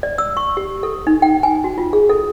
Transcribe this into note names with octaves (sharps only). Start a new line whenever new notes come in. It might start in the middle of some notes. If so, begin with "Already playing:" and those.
D5
E6
C#6
G4
A4
D#4
G5
G#5
F#4
F4
G#4
A4